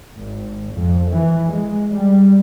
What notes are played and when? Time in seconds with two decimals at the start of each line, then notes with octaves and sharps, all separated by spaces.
0.15 G#1
0.72 F2
1.11 E3
1.52 G#3
1.92 G3